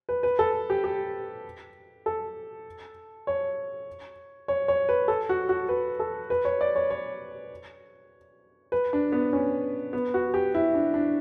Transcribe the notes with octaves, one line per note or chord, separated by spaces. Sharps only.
B4
B4
A4
G4
G4
A4
C#5
C#5
C#5
B4
A4
F#4
F#4
B4
A4
B4
C#5
D5
C#5
C#5
B4
D4
B3
C#4
B3
F#4
G4
E4
D4
D4